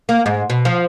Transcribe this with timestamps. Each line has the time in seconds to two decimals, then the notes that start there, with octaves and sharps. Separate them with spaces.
0.09 A#3
0.26 G#2
0.50 B2
0.65 F3